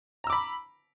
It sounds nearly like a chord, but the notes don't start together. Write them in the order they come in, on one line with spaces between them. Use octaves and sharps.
A#5 E6 D6 B5